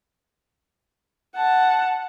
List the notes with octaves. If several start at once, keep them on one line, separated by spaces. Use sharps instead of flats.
F#5 A5